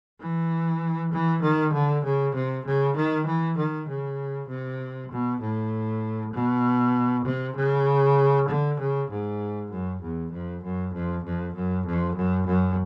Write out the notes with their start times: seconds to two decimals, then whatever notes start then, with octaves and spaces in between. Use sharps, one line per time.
0.20 E3
1.12 E3
1.42 D#3
1.73 D3
2.04 C#3
2.35 C3
2.65 C#3
2.96 D#3
3.26 E3
3.57 D#3
3.88 C#3
4.49 C3
5.11 B2
5.41 A2
6.33 B2
7.25 C3
7.56 C#3
8.48 D3
8.79 C#3
9.10 G#2
9.71 F#2
10.02 E2
10.32 F2
10.63 F#2
10.93 F2
11.24 F2
11.55 F#2
11.86 F2
12.15 F#2
12.47 F#2